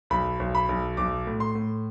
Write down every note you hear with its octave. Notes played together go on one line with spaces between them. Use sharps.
B1 B5
B1
B5
B1
B1 D6
A2
C6
A2